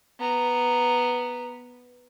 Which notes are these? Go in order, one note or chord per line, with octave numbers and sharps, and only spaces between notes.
B3 A#5